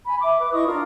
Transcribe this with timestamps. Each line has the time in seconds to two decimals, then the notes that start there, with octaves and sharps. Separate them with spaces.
0.05 G#5 B5
0.21 E5 D6
0.39 B4 D6
0.53 E4 D#5 C#6 D#6
0.66 D4 F4 A#4